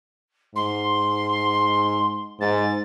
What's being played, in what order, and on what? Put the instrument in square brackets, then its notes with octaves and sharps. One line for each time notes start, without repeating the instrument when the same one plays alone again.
[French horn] G#2 [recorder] C6
[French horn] G#2 [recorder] A6